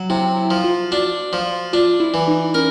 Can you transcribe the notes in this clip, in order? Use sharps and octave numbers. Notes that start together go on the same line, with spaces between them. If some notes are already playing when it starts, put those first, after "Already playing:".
Already playing: F#3
C3 E4
E4
F3
F4
D4 F#4
F3
D4 F4
E4
E3
D#4
C#4 A#4